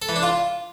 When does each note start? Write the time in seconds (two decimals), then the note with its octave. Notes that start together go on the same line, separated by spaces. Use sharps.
0.02 A4
0.09 E3
0.16 D4
0.23 F4